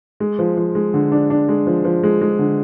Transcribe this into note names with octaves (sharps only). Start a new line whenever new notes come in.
G#3
F3
F3
G#3
D3
D4
D4
G#3
F3
F3
G#3
G#3
D3